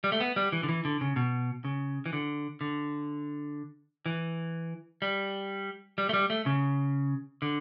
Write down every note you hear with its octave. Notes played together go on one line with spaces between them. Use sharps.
G3
A3
B3
G3
E3
D3
E3
D3
C#3
B2
C#3
E3
D3
D3
E3
G3
G3
A3
G3
A3
C#3
D3